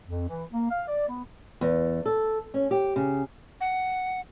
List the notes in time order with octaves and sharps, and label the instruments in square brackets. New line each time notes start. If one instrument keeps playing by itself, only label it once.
[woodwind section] F2
E3
A#3
F5
D5
B3
[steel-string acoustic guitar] E2
A4
C#4
G4
C#3
[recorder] F#5